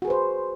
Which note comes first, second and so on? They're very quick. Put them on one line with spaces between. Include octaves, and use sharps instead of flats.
F#4 G#4 B4 C5